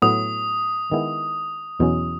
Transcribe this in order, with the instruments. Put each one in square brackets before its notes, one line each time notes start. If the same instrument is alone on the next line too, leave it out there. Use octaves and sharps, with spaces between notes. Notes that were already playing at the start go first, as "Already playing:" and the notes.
[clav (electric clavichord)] A2 F#3 B3 [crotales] D#6
[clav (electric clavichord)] D#3 G#3 B3 E4
E2 B2 F#3 C#4